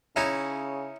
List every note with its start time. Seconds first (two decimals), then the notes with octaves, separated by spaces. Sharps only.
0.16 C#3 C#4 D#4 E4